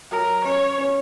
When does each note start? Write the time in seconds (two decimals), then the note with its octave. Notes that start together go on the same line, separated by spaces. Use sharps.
0.11 F#3 A#4
0.44 C#4 C#5
0.78 C#4